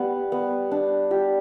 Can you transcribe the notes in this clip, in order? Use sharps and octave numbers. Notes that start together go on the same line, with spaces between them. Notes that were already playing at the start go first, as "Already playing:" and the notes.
Already playing: G3 B3
B3
D4
G4